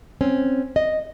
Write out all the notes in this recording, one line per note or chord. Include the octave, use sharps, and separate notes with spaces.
C4 C#4
D#5